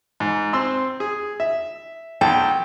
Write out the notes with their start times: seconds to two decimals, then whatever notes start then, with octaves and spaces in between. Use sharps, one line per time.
0.20 G#2
0.53 C4 C6 E6
1.00 G#4
1.40 E5
2.21 B1 G5 A5